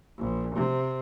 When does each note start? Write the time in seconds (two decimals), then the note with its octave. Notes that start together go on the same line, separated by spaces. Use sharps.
0.18 A#1
0.54 C3